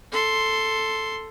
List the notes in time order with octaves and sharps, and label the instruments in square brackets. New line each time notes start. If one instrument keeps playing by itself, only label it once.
[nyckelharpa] A4 C6